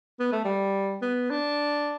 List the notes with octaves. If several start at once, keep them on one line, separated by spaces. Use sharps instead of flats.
B3
A3
G3
B3
D4